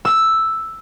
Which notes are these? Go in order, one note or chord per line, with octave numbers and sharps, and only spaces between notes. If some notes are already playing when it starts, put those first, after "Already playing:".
E6